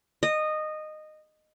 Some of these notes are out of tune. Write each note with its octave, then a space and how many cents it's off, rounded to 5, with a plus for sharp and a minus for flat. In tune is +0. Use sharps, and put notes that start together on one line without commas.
D#5 -15